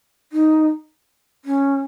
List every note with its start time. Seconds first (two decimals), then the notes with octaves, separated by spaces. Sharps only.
0.32 D#4
1.45 C#4